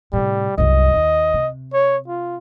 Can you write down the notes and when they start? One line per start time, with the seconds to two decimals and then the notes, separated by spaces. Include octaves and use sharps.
0.13 A2 C3 G3
0.58 C2 F#2 D#5
0.94 D#2
1.34 C3
1.73 C#5
2.08 F4